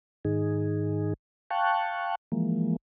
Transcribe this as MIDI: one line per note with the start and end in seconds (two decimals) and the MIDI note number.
0.25 1.14 44
0.25 1.14 51
0.25 1.14 63
0.25 1.14 68
1.51 2.15 77
1.51 2.15 79
1.51 2.15 81
1.51 2.15 85
1.51 2.15 90
2.32 2.76 52
2.32 2.76 53
2.32 2.76 56
2.32 2.76 58